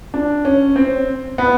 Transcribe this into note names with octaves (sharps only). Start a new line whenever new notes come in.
D4
C#4
C4
B3